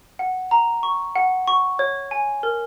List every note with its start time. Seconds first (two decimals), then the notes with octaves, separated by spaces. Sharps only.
0.19 F#5
0.51 A#5
0.83 C#6
1.15 F#5
1.48 C#6
1.79 C#5
2.11 G#5
2.43 A#4